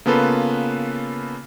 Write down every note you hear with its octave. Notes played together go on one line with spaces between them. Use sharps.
C#3 A#3 B3 F4 A4 B4